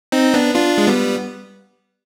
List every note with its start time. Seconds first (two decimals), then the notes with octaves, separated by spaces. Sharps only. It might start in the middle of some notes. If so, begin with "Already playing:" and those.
0.12 C4 D#4
0.34 B3 D4
0.55 D4 F4
0.78 G#3
0.87 G3 B3